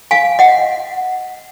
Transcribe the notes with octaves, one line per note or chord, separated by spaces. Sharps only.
F5 G#5
D#5 F#5